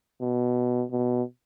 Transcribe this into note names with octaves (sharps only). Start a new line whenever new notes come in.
B2
B2